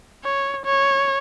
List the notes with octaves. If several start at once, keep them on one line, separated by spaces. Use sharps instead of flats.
C#5
C#5